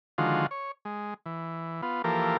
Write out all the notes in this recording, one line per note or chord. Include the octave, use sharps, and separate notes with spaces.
D3 D#3 F3 G#3 F4 F#4
C#5
G#3
E3
B3 F4
E3 F3 A#3 G4 A4 A#4